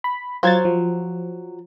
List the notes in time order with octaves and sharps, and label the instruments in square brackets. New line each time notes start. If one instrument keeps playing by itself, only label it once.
[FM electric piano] B5
[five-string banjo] F#3 C5 [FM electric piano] F4 G#6 A6
[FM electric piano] F3